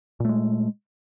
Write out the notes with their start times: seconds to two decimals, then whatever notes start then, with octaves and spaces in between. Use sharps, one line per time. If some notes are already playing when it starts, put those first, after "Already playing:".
0.20 A#2
0.25 A3
0.29 G#3